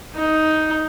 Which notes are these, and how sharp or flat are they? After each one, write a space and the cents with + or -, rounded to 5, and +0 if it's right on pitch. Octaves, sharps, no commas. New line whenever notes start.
D#4 +5